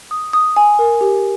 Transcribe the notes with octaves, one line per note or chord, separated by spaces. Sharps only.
D#6
D#6
G#5
A#4
G4